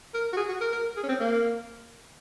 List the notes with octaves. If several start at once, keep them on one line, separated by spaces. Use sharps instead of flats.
A#4
F#4
G#4
F#4
A#4
A#4
G#4
C#4
C4
A#3